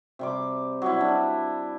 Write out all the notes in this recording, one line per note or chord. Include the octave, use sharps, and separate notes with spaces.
C3 G3 D6
F#3 G3 E4
G3 D4